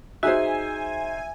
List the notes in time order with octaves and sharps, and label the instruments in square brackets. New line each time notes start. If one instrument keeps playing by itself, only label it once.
[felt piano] D#4 G#4 C5 [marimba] F#4 [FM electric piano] E5 [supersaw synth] G#5